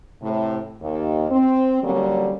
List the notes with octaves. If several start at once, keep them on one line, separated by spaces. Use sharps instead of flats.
A2 C3
D#2
C4
D3 F#3 G3 A#3 C#4